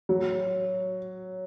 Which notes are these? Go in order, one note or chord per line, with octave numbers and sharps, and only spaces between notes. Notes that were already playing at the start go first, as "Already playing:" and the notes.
F#3